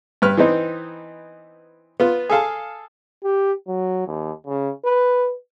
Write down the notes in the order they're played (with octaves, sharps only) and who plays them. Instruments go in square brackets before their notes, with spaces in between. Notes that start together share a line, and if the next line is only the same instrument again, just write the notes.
[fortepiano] G2 B4 F6
E3 B3 C4 D#4
B3 F4
G#4 A4 F5 A5
[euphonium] G4
F#3
D#2
C#3
B4